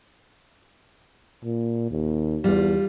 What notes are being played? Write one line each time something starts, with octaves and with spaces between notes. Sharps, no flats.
A#2
D#2
E2 G3 F4